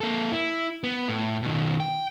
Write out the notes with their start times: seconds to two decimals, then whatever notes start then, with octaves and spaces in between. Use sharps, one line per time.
0.01 A#3 A4
0.32 E4
0.84 B3
1.08 A2
1.43 B2 D#3
1.80 G5